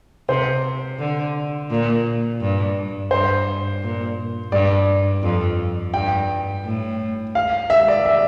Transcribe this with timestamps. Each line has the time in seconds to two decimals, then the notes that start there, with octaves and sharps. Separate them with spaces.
0.29 C3 C5
0.99 D3
1.70 A#2
2.41 G2
3.11 G2 C5
3.82 A#2
4.52 G2 D5
5.22 F2
5.94 G2 G5
6.64 A2
7.35 F5
7.70 E5
7.88 D5
8.06 E5